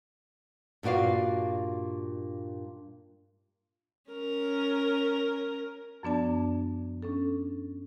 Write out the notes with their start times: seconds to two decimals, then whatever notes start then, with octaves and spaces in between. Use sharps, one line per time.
0.83 G2 A#2 F#4 D5 F5
4.11 C#4 A#4
6.03 F#2 F3 B3 D4 D5 A5
7.03 C#4 D4 A4